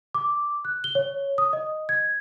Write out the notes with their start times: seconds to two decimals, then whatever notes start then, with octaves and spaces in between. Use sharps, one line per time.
0.14 D6
0.65 F#6
0.84 G7
0.95 C#5
1.38 D#6
1.53 D#5
1.89 G#6